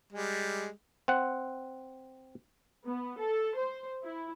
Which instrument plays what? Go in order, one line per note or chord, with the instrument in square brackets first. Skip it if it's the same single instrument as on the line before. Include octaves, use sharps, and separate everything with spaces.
[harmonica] G3 G#3
[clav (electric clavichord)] C4 F#5
[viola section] B3
A4
C5
E4